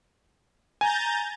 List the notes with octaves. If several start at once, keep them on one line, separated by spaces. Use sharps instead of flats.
G#5 A#5 G6 A6